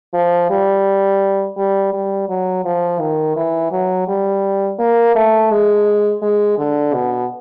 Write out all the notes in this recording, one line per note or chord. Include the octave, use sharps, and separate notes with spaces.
F3
G3
G3
G3
F#3
F3
D#3
E3
F#3
G3
A#3
A3
G#3
G#3
D3
B2